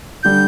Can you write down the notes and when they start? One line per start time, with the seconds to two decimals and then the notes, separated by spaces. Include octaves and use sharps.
0.23 D3 G3 G6